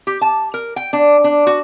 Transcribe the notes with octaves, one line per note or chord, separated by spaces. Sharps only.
G4
A5
A#4
G5
D4
D4
F#4